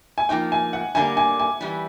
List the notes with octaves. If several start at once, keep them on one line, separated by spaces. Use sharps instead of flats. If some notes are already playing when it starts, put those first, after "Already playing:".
G#5
F3 A#3 D#4 G5
G#5
F#5
D3 G3 A#3 D4 G4 G#5
G#5
G#5
E3 G3